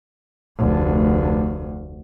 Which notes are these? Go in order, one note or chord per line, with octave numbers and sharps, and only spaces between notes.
F1 D2